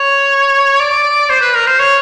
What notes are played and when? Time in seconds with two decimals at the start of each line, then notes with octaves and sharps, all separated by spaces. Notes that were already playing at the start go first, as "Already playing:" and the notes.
Already playing: C#5
0.80 D5
1.29 C5
1.41 B4
1.55 A#4
1.67 C5
1.79 C#5